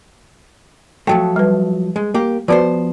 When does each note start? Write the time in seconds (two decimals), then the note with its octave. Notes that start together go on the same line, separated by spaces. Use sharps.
1.07 F3 F#3 A3 G5
1.36 G3 B4
1.96 G#3
2.14 A#3 G4
2.48 F3 B3 F#4 B4 C5 D5